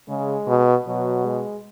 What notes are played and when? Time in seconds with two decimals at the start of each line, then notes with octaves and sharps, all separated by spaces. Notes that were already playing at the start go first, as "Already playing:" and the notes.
0.09 C#3 G#3
0.48 B2
0.87 B2 F#3
1.25 G#3